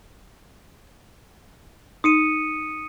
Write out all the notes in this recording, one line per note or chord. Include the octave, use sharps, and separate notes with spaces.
D#4 D#6 C#7 D#7